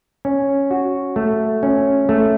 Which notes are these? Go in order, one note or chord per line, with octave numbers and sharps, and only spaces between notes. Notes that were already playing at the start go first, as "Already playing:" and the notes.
C#4
F#4
A3
C#4
A3